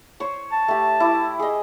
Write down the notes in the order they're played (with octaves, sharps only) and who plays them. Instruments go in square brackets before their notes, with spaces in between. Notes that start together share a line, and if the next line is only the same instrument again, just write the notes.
[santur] C5 C#5
[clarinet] A5
[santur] A3 G4
E4 D6
G#4 D#5